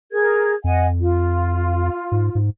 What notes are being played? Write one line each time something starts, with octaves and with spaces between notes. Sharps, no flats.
G#4 A#4 G#6
F2 D#5 F#5 G#5
F4
G#2
G#2